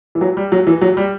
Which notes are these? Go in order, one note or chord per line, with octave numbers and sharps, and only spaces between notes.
E3
F#3
G3
F#3
E3
F#3
G3